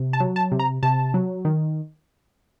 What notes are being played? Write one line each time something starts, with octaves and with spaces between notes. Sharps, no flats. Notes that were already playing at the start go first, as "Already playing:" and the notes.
Already playing: C3
A5
F#3
A5
C3
A#5
C3 A5
F#3
D#3